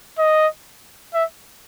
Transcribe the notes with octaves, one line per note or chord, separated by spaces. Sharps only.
D#5
E5